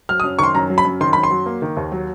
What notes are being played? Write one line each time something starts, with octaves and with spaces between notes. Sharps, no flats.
F#3 F6
D#6
F#2
D#3 C6 C#6
F#2 A#5
F#3
B5
F#2
D#3 C6
F#2 B5
C6
F#3
A#3
D#3
D#2
F#3